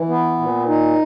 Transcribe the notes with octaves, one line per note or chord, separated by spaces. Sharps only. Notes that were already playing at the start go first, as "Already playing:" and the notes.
Already playing: E3
B3
A#2
D#4